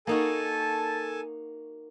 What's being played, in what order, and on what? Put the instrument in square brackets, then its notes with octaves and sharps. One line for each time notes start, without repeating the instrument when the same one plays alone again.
[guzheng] A#3 D#4 F#4 [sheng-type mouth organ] A4 G#5 A5